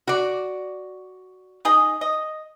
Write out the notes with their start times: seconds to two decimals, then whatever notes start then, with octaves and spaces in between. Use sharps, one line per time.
0.07 F#4 D5
1.65 D#4 G#4 D#5
2.01 D#5